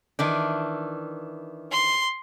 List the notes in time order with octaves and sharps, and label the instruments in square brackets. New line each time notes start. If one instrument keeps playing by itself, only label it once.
[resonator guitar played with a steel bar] D#3 E3 D4
[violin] C6